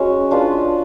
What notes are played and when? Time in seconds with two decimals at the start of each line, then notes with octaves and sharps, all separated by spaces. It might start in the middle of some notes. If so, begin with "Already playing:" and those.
Already playing: G#3 C#4 F#4
0.31 D4 F4 B4